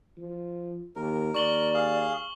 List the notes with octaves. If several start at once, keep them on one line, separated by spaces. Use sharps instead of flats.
F3
D#2 A#4
D#2 D5 C#6 F#7 G7
G#4 F5